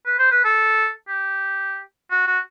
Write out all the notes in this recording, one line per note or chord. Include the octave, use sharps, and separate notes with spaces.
B4
C5
B4
A4
G4
F#4
F#4